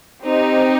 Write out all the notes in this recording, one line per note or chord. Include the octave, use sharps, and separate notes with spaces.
C4 D#4 G4